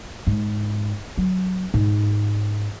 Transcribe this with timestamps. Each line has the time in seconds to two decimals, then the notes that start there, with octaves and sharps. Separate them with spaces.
0.27 G#2
1.18 F#3
1.74 G#2